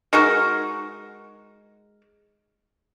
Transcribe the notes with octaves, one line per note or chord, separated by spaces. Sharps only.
G#3 D#4 F#4 A#4